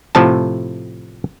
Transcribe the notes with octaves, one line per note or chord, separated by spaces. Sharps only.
A2 C3 F3 A4 A5